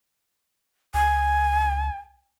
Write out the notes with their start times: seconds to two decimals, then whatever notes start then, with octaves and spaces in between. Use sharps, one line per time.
0.94 C#2 G#5